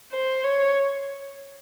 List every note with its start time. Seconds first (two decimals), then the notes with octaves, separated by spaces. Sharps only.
0.12 C5
0.44 C#5